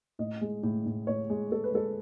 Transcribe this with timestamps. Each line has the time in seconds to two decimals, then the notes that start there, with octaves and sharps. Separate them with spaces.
0.19 A2 D#5
0.41 G#3
0.63 A2
0.86 A2
1.07 A2 C#5
1.30 G#3
1.51 G#3 A4
1.64 B4
1.73 G#3 A4